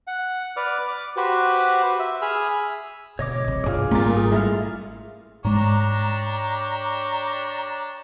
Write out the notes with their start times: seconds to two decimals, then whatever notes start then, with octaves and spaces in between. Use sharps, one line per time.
0.07 F#5
0.57 B4 D5 D6 F6
0.88 D6
1.17 F#4 G4 B4 C5
2.00 E5
2.22 G#4 B5 E6 F6
3.19 B2 D3 C#5 D#5 D6
3.44 C2 C3
3.64 B1 G2 F4 G#4 D5
3.91 G#1 A#2 G3 A#4 A6
4.17 G#4
4.32 G#3 A3 E4 F5
5.44 G#2 G#3 D4 G4 C#5 A#5